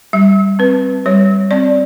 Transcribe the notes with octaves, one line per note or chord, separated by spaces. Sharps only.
G3 E5
C4 B4
G3 C#5
C4 D5